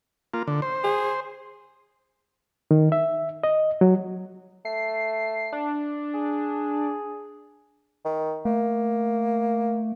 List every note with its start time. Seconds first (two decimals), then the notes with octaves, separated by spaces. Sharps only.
0.34 A#3 F4
0.48 D3
0.62 C5
0.84 G#4
2.71 D#3
2.92 E5
3.44 D#5
3.81 F#3
4.65 A3 C7
5.53 D4
6.14 G#4
8.05 D#3
8.45 A3 A#3